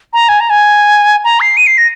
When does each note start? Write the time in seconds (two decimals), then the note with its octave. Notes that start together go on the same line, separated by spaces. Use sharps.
0.13 A#5
0.29 G#5
0.40 A#5
0.50 G#5
1.24 A#5
1.41 C7
1.57 D#7
1.67 C7
1.78 A#6